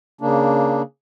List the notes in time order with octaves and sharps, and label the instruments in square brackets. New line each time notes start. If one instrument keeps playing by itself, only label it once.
[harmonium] C#3 A#3 D4